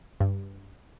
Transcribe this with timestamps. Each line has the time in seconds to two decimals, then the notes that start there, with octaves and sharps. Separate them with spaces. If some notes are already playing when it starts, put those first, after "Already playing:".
0.20 G2